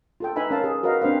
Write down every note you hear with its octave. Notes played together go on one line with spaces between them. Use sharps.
F4 A4 G5
D#4 B4 E5 G#5 B5
C#4 A#4 F5 A5
G#4
F#4 A#4 B4 D#5 F5
C4 D4 B4 C5 F5